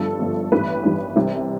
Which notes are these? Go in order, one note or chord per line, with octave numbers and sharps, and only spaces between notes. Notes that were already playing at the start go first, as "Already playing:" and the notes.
Already playing: G1 G2 F3 A4
G1 G2 F3
A1 G2 E3 G3 B4
A1 G2 E3 G3
C2 C3 E3 G3